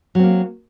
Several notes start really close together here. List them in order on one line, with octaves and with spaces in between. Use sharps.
F#3 C4 A#3